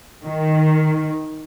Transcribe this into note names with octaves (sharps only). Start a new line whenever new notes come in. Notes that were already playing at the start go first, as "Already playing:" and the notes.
D#3